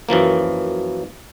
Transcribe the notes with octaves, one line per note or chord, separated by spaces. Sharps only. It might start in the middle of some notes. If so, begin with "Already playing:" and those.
F#2 E3 F3 A#3